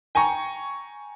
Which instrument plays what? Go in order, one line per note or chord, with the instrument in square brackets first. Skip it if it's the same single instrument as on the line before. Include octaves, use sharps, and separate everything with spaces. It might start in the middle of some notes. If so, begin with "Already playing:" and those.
[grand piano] G5 G#5 A#5 C#6